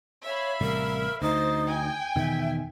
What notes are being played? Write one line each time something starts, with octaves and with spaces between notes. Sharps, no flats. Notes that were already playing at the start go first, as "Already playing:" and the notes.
C#5 E5 F5 B5
A1 C3 G3 A#4
D2 D#4 C5 A6
G5 G#5
E2 B2 D#3 E5